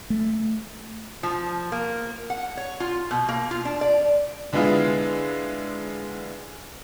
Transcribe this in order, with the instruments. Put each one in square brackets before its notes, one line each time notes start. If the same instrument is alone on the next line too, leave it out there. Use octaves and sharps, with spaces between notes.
[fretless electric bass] A3
[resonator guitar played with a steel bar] F3
A#3
F#5
C#5
F4
B2
A#3
F4
D4
D5
[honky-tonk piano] D3 G#3 B3 E4 F4 G#4